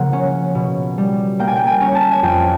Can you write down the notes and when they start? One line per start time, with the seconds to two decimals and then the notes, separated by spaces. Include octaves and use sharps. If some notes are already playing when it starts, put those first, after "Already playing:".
Already playing: C#3 F3 A#3 F#5
0.13 C#4
0.55 B2
0.98 G3
1.39 A#3 G5
1.48 G#5
1.56 G5
1.67 G#5
1.81 C#4
1.95 A5
2.12 G#5
2.23 F2 G5